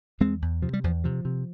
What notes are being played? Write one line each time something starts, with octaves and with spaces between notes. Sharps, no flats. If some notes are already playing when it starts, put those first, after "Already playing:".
E2 G#3 C4
E2
C3 F3
G3
E2 F3
C3 F3
C3